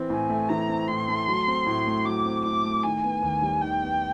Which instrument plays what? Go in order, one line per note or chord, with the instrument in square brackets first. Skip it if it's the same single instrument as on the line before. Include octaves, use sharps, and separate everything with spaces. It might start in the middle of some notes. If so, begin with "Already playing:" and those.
Already playing: [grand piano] E3 C4
[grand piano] A2 [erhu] G#5
[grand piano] A3
[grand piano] E3 [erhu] A#5
[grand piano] C4
[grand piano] A2 [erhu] C6
[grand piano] A3
F#3
C4
A2
A3
[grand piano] F#3 [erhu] D6
[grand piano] C4
[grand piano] A2 [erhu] D6
[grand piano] A3
[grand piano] D#3 [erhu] G#5
[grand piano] B3
D#2
G3
[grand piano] D#3 [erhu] G5
[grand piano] B3